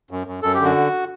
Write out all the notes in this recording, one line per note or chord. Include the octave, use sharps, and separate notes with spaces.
F#2
F#2
F#2 A4
D3 G4
F#4